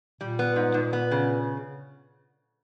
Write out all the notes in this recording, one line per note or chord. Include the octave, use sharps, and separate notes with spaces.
A#2 G3
B3
G#2
G#2
B3
C#3